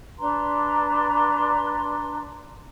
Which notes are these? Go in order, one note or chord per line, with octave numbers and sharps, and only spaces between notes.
D4 B4 A#5 C6